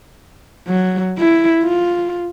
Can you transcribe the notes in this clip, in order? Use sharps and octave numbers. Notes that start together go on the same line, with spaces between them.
F#3
E4
F4